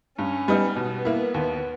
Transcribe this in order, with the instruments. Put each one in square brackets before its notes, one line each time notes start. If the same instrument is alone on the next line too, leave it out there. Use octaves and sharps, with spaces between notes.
[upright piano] G2 [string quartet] C#4
[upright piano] G3 B3 D#4
[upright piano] B2 [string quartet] B3
[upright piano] A#3 E4
D#2